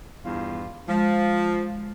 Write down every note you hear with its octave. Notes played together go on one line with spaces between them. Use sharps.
E2 G2 F4
F3 G#3